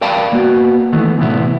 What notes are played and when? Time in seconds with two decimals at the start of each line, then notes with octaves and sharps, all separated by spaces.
0.01 A#4 D5 F5 G5 A5 B5
0.33 A#3 B3 F#4
0.92 D#3 E3 A3 B3
1.19 E2 A2 C3 E3 B3 E4